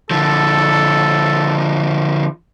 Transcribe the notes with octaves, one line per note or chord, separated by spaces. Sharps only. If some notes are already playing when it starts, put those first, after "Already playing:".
D3 F3 A4